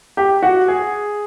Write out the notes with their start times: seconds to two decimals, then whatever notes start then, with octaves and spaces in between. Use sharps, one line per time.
0.17 G4
0.43 F#4
0.68 G#4